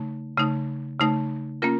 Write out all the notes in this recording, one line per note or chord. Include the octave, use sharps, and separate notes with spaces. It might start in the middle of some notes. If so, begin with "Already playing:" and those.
Already playing: C#3 A3 D#4
C#3 A3 D#4
C#3 A3 D#4
A#3 C#4 F4 A#4